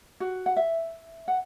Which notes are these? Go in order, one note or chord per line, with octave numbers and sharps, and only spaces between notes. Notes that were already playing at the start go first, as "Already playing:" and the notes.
F#4
F#5
E5
F#5